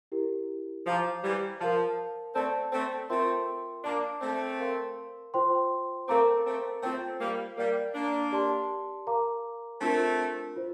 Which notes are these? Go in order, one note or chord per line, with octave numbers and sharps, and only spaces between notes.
E4 G4 A#4
F3 C5 F5 A#5 D6
E3 G3
F3 A#4 F5 A5
A3 C4 A4 D5 A5
A3 C4
A3 C4 F4 A#4 E5 G5 C6
A#3 D4 A#4 D5 A5 D6
A3 C4
A#4 F5 C6
F4 C5 G5 C6
A3 C4 A#4 F5 A#5 D6
A3 C4
A3 C4 F4 C5 G5
G3 A#3
G3 A#3 A#4 D5 F5
A#3 D4
G4 D5 A5 C6
A#4 F5 A#5 D6
A3 C4 D4 F4 A#4
F4 C5